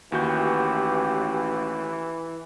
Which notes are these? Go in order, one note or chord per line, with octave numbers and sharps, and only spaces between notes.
A1 D#2 E3 E4 F#4 G4 G6